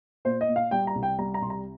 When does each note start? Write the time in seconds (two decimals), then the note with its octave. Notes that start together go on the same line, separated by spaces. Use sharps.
0.25 A#2 C5
0.41 D#5
0.48 A#2
0.56 F5
0.71 G3 G5
0.87 A#5
0.95 C2
1.03 G5
1.18 G3 A#5
1.34 A#5
1.42 C2 C6
1.50 A#5